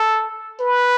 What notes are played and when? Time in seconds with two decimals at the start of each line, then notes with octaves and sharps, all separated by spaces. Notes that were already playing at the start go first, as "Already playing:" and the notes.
Already playing: A4
0.60 B4